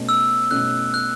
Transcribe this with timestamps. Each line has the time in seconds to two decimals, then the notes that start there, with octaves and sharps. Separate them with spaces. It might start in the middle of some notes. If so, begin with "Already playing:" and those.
Already playing: B2 A3 C#4
0.09 E6
0.51 B2 A3 C#4 F#6
0.94 F#6